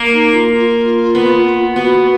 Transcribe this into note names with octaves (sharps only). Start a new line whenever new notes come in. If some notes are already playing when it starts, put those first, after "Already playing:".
Already playing: A#3
D#4
F4
F4
B3
B3 F#4